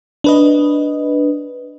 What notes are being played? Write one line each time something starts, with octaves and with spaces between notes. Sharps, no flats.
D4 B4 D#5